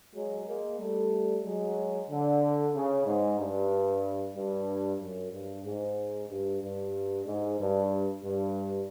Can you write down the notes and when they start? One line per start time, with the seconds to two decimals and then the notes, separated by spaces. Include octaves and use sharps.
0.15 F#3 G#3
0.47 G#3 A#3
0.79 G3 A3
1.44 F#3 G#3
2.09 D3
2.74 C#3
3.06 G#2
3.38 G2
4.35 G2
5.00 F#2
5.32 G2
5.65 G#2
6.30 G2
6.62 G2
7.26 G#2
7.59 G2
8.24 G2